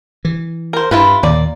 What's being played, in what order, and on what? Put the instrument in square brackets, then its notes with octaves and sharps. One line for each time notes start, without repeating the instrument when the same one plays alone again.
[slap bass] E3
[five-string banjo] A#4 C5
[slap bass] G2 [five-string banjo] E4 F4 B4
[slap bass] D#2 A#2 [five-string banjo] A#3 D5